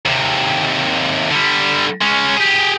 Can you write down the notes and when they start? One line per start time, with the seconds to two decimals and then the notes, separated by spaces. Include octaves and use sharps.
0.05 D#2 C3
1.31 D3 G3
2.01 G#3 C#4
2.36 G4 G#4